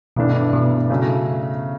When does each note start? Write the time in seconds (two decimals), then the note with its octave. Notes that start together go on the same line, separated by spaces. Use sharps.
0.16 G#1 G2 B2 E3 A3 D4
0.53 B2
0.90 C#3 F#3 A3